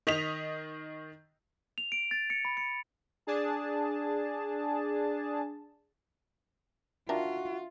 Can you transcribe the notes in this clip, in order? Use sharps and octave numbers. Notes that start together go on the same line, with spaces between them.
D#3 D#5 B6 F7
F7
D7
A6
C#7
B5
C#7
D4 G#4 A5
D#3 D4 F4 F#4 A#4 E5